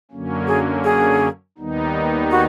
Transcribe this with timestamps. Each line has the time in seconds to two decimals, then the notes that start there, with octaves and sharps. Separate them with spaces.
0.11 F#2 D3 F#3 A#3 C#4
0.48 G#4
0.84 G#4
1.58 D#2 D#3 G3 B3 D#4
2.31 F#4